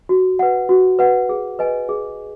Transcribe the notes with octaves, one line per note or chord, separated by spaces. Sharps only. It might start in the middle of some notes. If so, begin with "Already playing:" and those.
F#4
B4 F#5
F#4
B4 F#5
G#4
B4 D#5 G#5
G#4